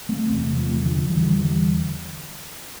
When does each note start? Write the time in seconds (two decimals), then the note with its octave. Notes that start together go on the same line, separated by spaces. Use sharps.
0.09 A3 C4
0.29 E2 C3 A3 C4
0.55 F3 A3
0.83 D3 F3
1.09 E2 D3 E3 G3
1.36 E3 G3